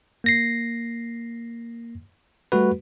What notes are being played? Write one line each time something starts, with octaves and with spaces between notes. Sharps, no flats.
A#3 A#6 C7
G3 A3 F#4 B4